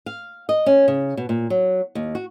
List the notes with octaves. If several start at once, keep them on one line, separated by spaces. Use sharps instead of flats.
F5
D#5
C#4
C#3
B2
A#2
F#3
D#2
F#4